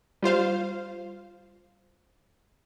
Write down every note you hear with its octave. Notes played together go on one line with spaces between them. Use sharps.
G3 F4 C5 F5